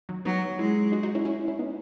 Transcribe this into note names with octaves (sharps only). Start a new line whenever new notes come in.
D#3 F#3
F#3 B3 D#4
G#3 C#4 E4
D#4 F#4
D#4 F#4
C#4 E4
C#4 E4
C#4 E4
B3 D#4